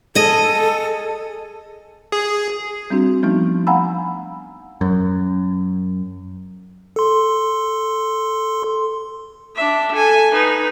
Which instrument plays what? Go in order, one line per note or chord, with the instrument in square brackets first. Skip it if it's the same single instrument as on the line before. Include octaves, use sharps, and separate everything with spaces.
[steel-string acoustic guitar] G#4 D#5 [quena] A4
[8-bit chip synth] G#4
[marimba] G3 C4 D4 F#4
F3 G3 A3 B3 D4 D#4
F5 F#5 G#5 A#5 B5 E6
[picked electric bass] F#2
[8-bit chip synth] A4 C6
[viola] D4 E5
A4 G#5
D#4 B4